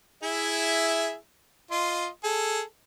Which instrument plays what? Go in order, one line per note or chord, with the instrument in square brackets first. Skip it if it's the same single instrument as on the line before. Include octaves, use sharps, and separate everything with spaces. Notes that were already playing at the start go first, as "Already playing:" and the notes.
[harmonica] E4 G#4 E5
F4 D#5 C6
G#4 A4